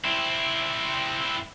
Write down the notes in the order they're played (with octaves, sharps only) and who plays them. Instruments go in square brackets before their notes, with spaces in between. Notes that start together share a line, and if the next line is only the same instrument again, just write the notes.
[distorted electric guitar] C4 E4